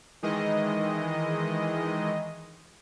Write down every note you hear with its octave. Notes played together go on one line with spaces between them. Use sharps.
D#3 E3 G#3 D#5